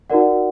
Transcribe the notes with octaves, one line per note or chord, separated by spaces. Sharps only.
D#4 F#4 A#4 D5 F#5